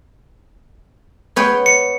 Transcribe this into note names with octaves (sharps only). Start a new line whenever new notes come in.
B3 C#5 G5
C#7